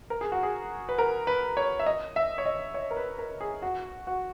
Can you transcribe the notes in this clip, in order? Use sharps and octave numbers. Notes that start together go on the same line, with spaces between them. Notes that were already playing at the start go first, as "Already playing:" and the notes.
A#4
G#4
F#4
G#4
B4
A#4
B4
C#5
E5
D#5
E5
C#5
D#5
C#5
A#4
B4
A#4
G#4
F#4
F#4